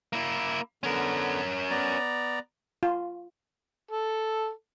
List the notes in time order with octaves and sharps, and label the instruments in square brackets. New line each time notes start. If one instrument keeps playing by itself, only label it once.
[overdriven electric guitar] A#3 E4
[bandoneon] D3 B3 [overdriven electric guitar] C#4 A#4
[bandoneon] B3 D5 A#5
[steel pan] F4
[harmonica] A4